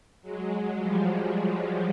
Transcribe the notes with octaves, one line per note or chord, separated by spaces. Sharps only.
F#3 G#3
F3 G3